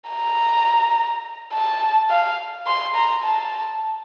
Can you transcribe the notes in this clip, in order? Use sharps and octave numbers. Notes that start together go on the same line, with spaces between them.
A#5
A5
F5
C6
A#5
A5